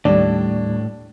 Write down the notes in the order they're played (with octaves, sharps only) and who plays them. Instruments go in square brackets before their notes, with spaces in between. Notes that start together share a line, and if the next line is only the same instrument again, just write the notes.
[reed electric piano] D#2 G3 [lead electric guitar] A2 [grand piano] D4 [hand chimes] D5